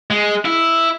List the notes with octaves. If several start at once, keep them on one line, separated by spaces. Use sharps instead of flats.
G#3
E4